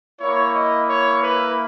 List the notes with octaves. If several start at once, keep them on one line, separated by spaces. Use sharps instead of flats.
A#3 E4 C#5
D#5
C#5
B4